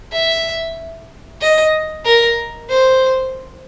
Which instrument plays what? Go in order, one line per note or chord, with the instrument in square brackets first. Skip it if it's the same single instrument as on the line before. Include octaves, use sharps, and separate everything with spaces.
[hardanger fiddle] E5
D#5
A#4
C5